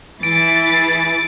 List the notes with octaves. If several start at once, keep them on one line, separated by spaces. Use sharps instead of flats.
E3 G#4 A6 D7